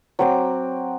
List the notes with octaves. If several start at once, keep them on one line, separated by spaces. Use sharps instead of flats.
F#3 C4 D6